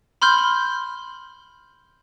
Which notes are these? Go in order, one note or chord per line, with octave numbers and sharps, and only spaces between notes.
B5 C6 F6 G6